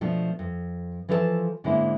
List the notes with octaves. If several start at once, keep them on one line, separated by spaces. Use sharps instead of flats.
B2 F3 A3 D4
F2
E3 F3 F4 A4 C#5 A5
G#2 D3 G#3 A#3 C#4 E4